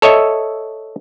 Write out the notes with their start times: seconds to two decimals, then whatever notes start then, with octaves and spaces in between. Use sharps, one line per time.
0.02 A4 C#5 D#5 E5